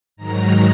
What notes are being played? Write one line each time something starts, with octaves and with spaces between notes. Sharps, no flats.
G#2 D#3 F#3 A#5